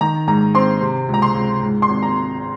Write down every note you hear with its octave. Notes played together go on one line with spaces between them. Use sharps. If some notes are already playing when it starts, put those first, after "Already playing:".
D#3 A#5
G#2 A#5
C4 C6
C3
C#2
A#5
C6
C#2
G#2
C6
G#1
A#5